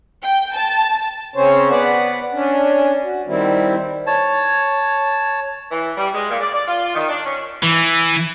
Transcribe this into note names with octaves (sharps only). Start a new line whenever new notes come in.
G5
A5
C#3 C4 C#4 C5 C#5
B3 B4 D5 F#5
C#4 D4
F#4
D#3 G3 C4 E4
C#5 A5
E3
G3
G#3
A#2
D5
D5
F4
D#3
D4
C#4
E3